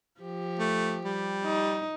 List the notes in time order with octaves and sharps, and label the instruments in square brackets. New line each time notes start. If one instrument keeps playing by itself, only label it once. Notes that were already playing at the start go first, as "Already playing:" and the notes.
[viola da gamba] F3 G4
[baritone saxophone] A3
G3
[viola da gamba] D#4